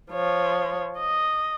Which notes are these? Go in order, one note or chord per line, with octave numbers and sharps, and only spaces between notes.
F3 C#5
D#5